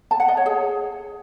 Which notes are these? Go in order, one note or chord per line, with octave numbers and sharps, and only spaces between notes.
A5
F#5
D#5
C#5
G#4